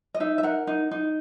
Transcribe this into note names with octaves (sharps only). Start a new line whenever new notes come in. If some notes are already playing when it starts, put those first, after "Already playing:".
D#5
D#4 E5
E5
A#4 F#5
D#4
D#4